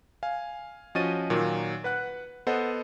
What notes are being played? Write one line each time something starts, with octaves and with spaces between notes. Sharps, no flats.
F5 G#5
F3 C#4 F#4 D#5 A6 D#7
A#2 D#3 F#3 A#3
B4 F#5 F#6
B3 A4 C5 D#5 F#5